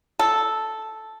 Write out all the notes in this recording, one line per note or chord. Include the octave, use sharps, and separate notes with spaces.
A4